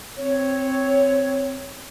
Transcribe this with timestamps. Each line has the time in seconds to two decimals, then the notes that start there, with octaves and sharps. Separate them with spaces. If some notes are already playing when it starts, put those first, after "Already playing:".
0.17 C4 C#5